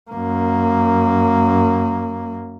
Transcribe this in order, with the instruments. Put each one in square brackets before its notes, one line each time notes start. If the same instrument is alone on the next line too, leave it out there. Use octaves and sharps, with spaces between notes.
[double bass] F#2 A#3